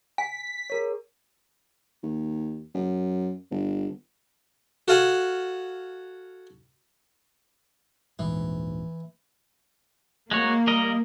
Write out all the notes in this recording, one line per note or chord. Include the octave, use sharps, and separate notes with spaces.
G#5 B6
G#4 A#4 C#5
D#2
F#2
G1
F#4 A4 F5 F#5 G#5
D#1 A#1 G#2 E3
G#3 A#3 F#4 C#5
G3 A#4 D#5